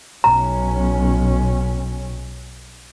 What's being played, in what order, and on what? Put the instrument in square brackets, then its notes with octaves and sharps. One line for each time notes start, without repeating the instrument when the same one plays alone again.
[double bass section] B1 C#4 [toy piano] A#5